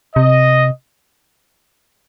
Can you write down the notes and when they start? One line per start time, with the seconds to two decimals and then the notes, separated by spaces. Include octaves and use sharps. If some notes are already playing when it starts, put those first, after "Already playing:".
0.15 C3 D#5